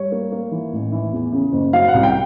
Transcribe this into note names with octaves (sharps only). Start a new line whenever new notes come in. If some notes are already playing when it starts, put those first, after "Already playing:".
Already playing: G3 C#5
A#3
A#3
E3
A1
E3
E2
C#3
F#1
F#3 F5
F#5
C2
G5